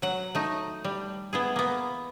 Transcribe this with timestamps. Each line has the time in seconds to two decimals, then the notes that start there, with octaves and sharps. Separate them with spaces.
0.02 F#3 F#5
0.35 A3 D#4
0.84 G3
1.33 B3 E4 G#4
1.56 A#3 B3